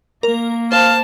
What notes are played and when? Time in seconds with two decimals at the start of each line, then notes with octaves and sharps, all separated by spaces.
0.23 A#3 A#4
0.72 C5 F5 A5